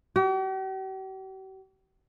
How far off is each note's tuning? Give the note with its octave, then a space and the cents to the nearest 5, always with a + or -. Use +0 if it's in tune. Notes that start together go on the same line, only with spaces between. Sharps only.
G4 -45